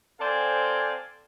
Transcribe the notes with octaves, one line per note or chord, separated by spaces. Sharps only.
C4 A4 C5 D5 F5 G#5